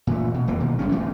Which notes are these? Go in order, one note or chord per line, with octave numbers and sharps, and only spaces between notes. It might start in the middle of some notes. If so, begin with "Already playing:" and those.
A#2 E3 A3
B2
D#1 F2 E3 A#3
B2 D#3 A#3
F#1 G2 C3 C#4
E3 A3 C4